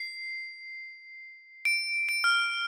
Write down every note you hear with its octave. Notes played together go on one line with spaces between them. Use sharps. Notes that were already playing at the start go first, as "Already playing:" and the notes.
Already playing: C7
D7
D7
F6